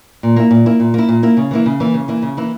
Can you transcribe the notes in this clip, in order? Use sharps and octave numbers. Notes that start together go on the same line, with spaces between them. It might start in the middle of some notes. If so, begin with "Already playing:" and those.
A#2
A#3 E4
A#2
A#3 E4
A#2
A#3 E4
A#2
A#3 E4
C#3
E3 A#3 E4
C#3
E3 A#3 E4
C#3
E3 A#3 E4
C#3
E3 A#3 E4